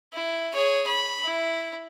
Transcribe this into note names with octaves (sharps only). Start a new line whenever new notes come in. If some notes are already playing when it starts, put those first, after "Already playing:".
E4
G#4 C#5
B5
E4